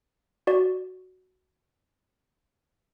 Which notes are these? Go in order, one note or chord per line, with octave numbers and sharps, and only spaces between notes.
F#4 D5